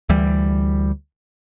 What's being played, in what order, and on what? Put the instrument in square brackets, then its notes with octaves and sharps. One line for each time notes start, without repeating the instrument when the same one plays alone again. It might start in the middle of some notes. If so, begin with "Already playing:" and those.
[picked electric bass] D2 E3 G3